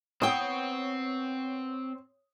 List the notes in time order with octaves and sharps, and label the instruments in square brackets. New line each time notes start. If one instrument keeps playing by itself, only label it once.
[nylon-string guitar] B3 G5 [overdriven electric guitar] C4 [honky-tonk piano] C#5 D#6